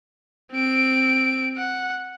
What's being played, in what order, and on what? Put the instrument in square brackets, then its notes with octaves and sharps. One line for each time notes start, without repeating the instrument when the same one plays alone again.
[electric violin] C4 D7
F#5